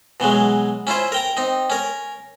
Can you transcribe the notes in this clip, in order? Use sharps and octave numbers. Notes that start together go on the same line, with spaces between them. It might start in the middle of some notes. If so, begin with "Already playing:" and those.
B2 E3 F#3 G#3
C#4 E4 F4 C5
A#4 G5 A#5
C4 D#4
C#4 A#4